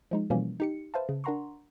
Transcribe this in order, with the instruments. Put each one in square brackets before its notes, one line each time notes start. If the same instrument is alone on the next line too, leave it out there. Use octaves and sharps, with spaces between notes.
[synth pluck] F3 G#3 D#4
B2 E3 F3 G3 A#3 C#4
D#4 G4 C#7
B4 C5 E5 F5 A5
C#3
D4 A#4 F#5 A#5 C6 C#6